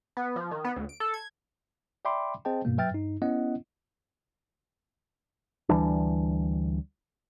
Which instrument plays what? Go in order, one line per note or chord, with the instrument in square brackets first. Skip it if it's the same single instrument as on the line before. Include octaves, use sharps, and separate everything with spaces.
[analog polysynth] B3
F3
D#3
B3
D2
D7
A4
G#6
[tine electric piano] D5 E5 G5 B5 C6 D6
C4 G#4 C5 D#5 G5 A5
G2 B2 A#3
F#3 B4 E5 G5 F6 A6
G2 D#4
B3 C#4 E4 D#5 F#5
[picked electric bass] D2 E3 G3 D4